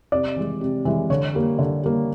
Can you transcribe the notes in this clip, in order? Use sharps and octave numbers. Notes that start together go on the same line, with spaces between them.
C3 D5
E3 G#3
C3
E3 G#3
D3 C#5
G3 A#3
D3
G3 A#3